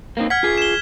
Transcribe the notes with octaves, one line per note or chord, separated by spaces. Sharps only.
A#3 C4 D#4
F#5 F6 G#6 B6
F4 G#4
E7 G7